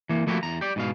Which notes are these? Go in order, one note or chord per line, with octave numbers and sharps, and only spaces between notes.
E3 A#3
F3 A3 A#3 E4 F#4 G4
E2 A#5
G4 D5
G#2 B2 F5